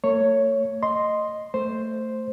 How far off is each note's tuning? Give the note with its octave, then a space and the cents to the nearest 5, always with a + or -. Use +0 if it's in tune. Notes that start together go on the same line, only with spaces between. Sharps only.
A3 +45 C#5 +0
D#5 -5 C6 +0
A3 +15 C5 +0